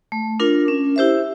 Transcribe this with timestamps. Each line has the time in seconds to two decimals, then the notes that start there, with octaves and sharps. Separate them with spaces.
0.12 A3
0.40 D4 F4 A#4
0.68 C#4
0.96 E4 G4 C5 E5